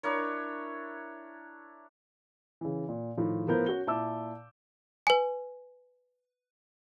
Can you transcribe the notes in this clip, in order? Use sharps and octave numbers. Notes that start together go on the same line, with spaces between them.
D4 E4 A#4 C#5
C#3 E3
A#2
A2 D#3 F3
A2 F3 B3 A#4 C5 G6
C#4 F#4 G7
A#2 E4 A5 D6 E6
B4 G#5